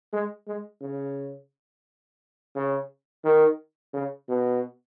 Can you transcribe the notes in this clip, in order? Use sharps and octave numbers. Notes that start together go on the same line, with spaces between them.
G#3
G#3
C#3
C#3
D#3
C#3
B2